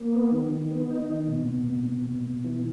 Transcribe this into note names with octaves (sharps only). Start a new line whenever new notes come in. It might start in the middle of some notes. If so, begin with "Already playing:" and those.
Already playing: A#3
B3
D#3
D#3
B3
D#4
D#3
B2
B2
B2
B2
B2
B2
E3